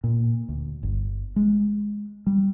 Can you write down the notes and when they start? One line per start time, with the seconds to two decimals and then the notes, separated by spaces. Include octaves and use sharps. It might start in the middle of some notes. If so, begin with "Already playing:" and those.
0.04 A#2
0.49 D2
0.83 G1
1.36 G#3
2.27 G3